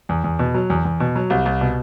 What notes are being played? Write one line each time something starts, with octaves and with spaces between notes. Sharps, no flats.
E2
E2
B2
F#3
E2
E2
B2
F#3
C2
C2
B2